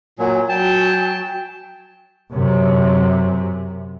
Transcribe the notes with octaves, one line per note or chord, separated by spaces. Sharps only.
A#2 F#3 G#5
F#3 G5 A5
F#2 C3